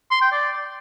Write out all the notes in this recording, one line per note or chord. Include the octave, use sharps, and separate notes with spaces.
C6
G5
D5